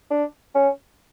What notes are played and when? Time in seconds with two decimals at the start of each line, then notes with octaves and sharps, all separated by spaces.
0.11 D4
0.55 C#4